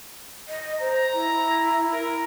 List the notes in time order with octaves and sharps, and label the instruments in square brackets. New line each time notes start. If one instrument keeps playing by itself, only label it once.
[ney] D#5
[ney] C5 [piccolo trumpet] A#5
[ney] E4
[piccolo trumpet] A#4